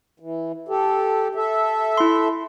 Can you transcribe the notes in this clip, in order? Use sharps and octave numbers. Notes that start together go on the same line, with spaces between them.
E3
G4 A4
A4 E5
E4 C6